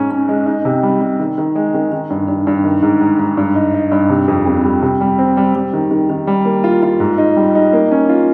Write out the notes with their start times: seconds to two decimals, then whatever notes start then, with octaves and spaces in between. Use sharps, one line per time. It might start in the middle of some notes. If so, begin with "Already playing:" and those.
Already playing: G#2 C#4
0.11 C#4
0.29 G#3
0.46 D#4
0.65 C3
0.83 G3
1.01 G3
1.20 D#3
1.38 D#3
1.55 G#3
1.74 D#3
1.92 D#3
2.10 G2
2.28 G2
2.47 G2
2.64 D#3
2.82 G#2
3.01 G#2
3.19 G#2
3.37 G2
3.56 D#4
3.74 D#4
3.92 G2
4.09 C3
4.28 F2
4.46 F2
4.64 G3
4.82 C3
5.01 G3
5.19 C4
5.37 G3
5.55 G3
5.74 D#3
5.91 D#3
6.10 D#3
6.27 G3
6.45 A#3
6.64 F4
6.83 F4
7.00 G#2
7.18 D#4
7.36 G3
7.55 D#4
7.73 A#3
7.92 C#4
8.09 F4